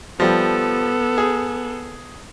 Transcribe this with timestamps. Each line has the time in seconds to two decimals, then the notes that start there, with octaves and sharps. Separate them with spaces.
0.20 F3 G3 B3 A4
1.18 G#4